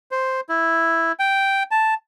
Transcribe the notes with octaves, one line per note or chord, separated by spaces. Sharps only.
C5
E4
G5
A5